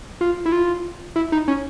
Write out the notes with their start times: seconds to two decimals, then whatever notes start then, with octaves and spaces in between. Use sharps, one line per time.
0.21 F4
0.46 E4
0.52 F4
1.16 E4
1.32 D#4
1.48 C#4